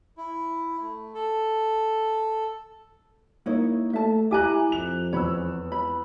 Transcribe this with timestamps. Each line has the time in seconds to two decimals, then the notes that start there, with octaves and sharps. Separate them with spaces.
0.18 E4
0.81 A3
1.15 A4
3.46 A#3 D#4 E4 C#5
3.93 A3 E5 A5
4.31 E4 G4 G#5 A#5 D6 F#6
4.72 F2 F7
5.13 E2 C#5 B5 E6
5.72 B5